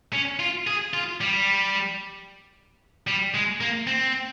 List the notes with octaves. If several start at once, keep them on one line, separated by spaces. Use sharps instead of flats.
C#4
F4
G#4
F4
G3
G3
G#3
A#3
C4